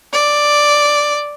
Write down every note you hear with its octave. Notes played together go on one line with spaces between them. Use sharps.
D5